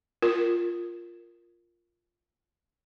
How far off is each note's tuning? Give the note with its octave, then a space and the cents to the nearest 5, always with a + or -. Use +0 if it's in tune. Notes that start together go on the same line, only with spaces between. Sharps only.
F4 +0 A#4 +0